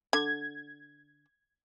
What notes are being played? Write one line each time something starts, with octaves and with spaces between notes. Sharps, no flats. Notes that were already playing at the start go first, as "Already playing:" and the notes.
D3 G#6